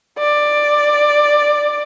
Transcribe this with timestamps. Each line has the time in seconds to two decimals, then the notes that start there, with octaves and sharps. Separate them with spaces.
0.19 D5